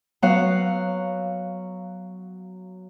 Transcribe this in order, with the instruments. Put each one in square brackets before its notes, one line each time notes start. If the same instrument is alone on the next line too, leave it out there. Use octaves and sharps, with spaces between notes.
[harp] F#3 B3 F5 F#5